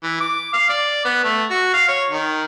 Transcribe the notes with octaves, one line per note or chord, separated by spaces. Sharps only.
E3
D6
F5
D5
B3
A3
F#4
F5
C#5
D#3